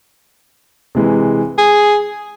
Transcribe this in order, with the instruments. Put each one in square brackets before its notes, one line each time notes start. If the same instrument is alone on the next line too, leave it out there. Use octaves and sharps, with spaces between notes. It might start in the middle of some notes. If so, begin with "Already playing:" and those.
[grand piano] C3 E3 G#3
[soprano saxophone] G#4